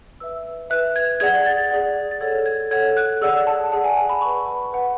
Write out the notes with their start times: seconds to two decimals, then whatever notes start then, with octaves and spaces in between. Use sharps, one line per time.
0.20 B4 E5 E6
0.70 B4 E5 F#6
0.96 G#6
1.20 G#4 D5 F#5 G#6
1.46 A6
1.71 G#4 D5 F#5
2.11 A6
2.21 A4 C#5 F#5 G#6
2.46 G#6
2.71 A4 C#5 F#5 G#6
2.97 F#6
3.22 G#4 D5 F#5 E6
3.47 A5
3.72 G#4 D5 F#5 A5
3.84 G#5
3.97 A5
4.09 B5
4.22 B4 F#5 C#6
4.73 B4 F#5